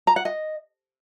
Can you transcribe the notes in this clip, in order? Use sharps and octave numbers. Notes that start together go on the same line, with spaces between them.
A#5
F#5
D#5